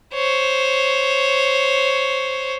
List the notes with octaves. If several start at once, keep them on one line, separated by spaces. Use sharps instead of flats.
C5 C#5